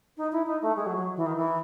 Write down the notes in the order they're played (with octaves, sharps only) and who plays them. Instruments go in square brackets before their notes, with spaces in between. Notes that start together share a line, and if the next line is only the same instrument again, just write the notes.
[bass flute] D#4
E4
D#4
A3
G#3
F#3
F#3
E3
D#3
E3